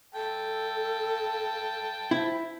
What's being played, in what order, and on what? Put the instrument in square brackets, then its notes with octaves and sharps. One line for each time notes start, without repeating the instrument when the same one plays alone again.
[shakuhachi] A4 [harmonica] G5 A5
[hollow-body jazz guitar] E4 [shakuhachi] C5